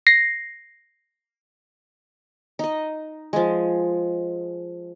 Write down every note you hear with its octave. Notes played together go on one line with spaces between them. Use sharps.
A#6 C7
D#4 D#5
F3 G#3